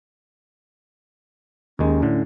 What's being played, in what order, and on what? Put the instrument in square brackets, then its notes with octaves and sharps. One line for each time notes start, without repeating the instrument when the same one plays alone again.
[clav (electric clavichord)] D#2 D#3 G#3 [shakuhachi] C#4
[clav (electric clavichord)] A2 D3